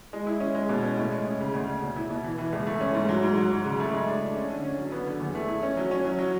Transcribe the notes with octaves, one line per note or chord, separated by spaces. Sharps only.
G#3
E4
C#4
G#3
B2
C#4
A2
G#3
C#4
C#3
D2
D2
B2
E4
B2
E3
E3
C#2
A3
C#4
G#2
F#3
G#2
F#3
F#3
C#3
A3
G#3
D4
D4
C#4
D3
C#4
F#3
B3
D3
E2
A3
E4
C#4
F#3
C#4
F#3
F#3